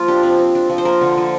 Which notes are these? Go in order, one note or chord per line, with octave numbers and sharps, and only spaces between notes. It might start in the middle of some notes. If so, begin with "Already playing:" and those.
Already playing: F3 A#3 F4
D4 G4
C4
C4
D4
F3
C5
A#3 A#4
D3
F3